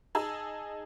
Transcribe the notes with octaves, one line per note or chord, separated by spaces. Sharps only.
D#4 G#4 A5 E6